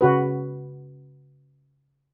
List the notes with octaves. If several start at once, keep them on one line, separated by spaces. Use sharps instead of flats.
C#3 F#4 B4